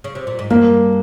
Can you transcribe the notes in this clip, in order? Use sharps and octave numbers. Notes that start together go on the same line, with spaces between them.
C#3
C3
A#2
G#2
G2 A#3